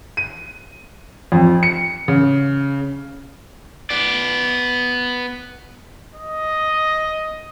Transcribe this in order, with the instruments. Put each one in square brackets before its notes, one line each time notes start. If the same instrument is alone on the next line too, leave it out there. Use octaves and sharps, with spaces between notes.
[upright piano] D#7
F2
C#7
C#3
[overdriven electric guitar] B3 D5
[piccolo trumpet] D#5